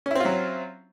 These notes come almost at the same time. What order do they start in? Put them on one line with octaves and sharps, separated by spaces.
C#4 E4 C4 F4 F#3